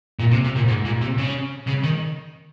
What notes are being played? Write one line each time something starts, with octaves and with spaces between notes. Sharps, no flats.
A#2
C3
C3
A#2
G#2
A#2
C3
C#3
C#3
D#3